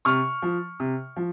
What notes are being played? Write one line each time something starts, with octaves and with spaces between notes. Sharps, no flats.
C3 C#6 F6
F3
C3
F3